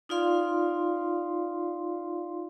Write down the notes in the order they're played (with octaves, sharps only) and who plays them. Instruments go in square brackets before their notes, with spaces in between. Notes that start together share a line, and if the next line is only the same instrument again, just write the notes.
[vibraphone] D#4 F4 D5 F5 C6